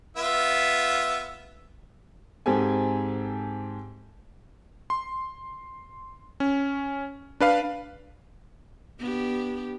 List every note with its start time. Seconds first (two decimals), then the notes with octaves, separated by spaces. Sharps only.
0.17 B3 F4 E5
2.46 G#2 C4 G4 A4 G#5
4.90 C6
6.40 C#4
7.40 D4 B4 F5
8.99 B3 D4 G4